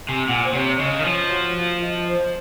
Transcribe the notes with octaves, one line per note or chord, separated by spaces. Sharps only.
C3 G#5
A#2 F#5
C5
C3 C#5
C#5
C#3 D#5
D#3
F3 C#5
F#4
F4
D#5
C5